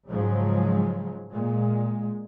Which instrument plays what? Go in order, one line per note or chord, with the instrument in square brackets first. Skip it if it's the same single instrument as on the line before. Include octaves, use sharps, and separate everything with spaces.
[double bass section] G#2 C#3 F3 F#3 G#3
A#2 G#3